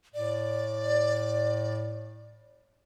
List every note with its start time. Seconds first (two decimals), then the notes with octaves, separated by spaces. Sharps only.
0.14 A2 D5